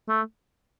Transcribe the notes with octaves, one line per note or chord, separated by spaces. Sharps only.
A3